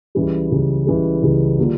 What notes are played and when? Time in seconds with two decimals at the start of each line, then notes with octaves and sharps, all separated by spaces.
0.15 C#2 C#3 E3 G3
0.51 C#2 C#3 E3 G3
0.87 C#2 C#3 E3 G3
1.22 C#2 C#3 E3 G3
1.58 D3 G3 A#3 D4 F4